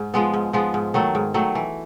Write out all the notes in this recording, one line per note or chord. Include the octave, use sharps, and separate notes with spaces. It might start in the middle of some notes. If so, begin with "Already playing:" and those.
Already playing: G#2
F3 G#3 B3
G#2
F3 G#3 B3
G#2
D#3 F#3 A3
G#2
D#3 F#3 A3
E3